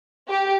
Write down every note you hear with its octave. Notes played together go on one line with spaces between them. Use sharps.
G4